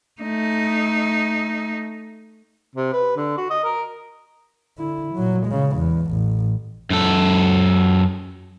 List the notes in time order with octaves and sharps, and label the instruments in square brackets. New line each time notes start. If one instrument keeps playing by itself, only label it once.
[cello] A3 D#4
[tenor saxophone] C3
B4
D3
F#4
D#5
A#4
[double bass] D3 E4
A#2 F#3
C#3 G#3
E2
A1
[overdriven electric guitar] F#2 A4